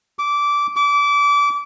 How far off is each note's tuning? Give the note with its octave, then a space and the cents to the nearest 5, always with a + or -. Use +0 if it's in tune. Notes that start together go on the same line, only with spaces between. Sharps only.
D6 -15
D6 -25